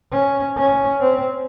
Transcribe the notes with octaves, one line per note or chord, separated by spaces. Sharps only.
C#4
C#4
C4